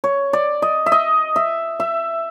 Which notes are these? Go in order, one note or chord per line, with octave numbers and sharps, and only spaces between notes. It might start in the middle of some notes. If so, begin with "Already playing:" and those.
C#5
D5
D#5
E5
D#5
E5
E5